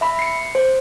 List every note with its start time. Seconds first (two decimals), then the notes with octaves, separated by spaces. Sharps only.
0.01 E5 B5
0.19 C7 C#7
0.55 C5